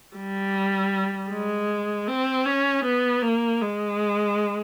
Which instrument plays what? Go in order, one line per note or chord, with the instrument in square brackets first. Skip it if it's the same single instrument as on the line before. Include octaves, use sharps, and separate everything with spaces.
[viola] G3
G#3
C4
C#4
B3
A#3
G#3